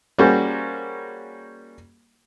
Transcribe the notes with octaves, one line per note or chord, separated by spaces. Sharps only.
G3 A#3 C#4 F#4 G#4 C5